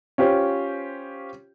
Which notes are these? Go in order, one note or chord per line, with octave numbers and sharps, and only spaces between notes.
C#4 F4 G4 C5